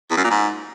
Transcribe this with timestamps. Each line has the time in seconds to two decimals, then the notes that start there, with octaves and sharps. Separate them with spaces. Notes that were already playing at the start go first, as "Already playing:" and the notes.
0.10 E2
0.17 F#2
0.24 A#2
0.31 G#2